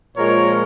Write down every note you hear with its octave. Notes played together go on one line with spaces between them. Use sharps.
A#2 F3 G#3 A#4 C#5